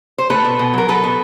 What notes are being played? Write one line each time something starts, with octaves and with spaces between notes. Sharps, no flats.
C5
A3 A4 B4
B2
B2
F#3 A#4
F#3 A4 B4
B2